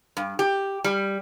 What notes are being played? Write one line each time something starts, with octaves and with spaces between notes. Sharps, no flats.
G2
G4
G3